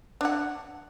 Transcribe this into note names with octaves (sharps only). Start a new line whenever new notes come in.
D4 F#5